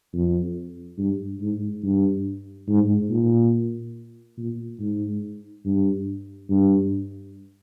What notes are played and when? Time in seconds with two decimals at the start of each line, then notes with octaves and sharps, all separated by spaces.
0.13 F2
0.98 G2
1.41 G#2
1.83 G2
2.68 G#2
3.10 A#2
4.37 A#2
4.79 G#2
5.65 G2
6.50 G2